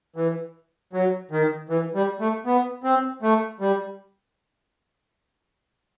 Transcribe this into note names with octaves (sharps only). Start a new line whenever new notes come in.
E3
F#3
D#3
E3
G3
A3
B3
C4
A3
G3